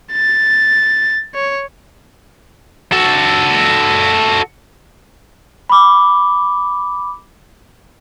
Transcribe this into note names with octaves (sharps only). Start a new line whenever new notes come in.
A6
C#5
F#4 A4
B5 D6